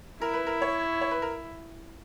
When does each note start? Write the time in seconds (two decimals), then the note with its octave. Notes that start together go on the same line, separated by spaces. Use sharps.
0.21 E4 A#4
0.33 B4
0.47 A#4
0.62 C#5
1.01 C#5
1.11 B4
1.22 A#4